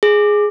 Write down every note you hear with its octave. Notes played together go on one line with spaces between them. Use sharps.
G#4